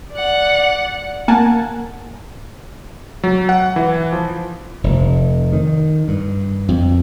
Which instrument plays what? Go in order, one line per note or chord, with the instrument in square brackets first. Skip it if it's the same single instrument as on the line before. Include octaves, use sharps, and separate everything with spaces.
[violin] D5 F#5
[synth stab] A#3 A#4 F#5 G#5 A5
[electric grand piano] F#3
F#5
E3
F3
[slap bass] F1
D#3
G2
F2